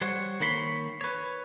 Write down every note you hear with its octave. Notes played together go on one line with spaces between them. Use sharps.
G3 C5 C#5 F#5
D#3 A#3 C#5 B5 C6
B4 C#5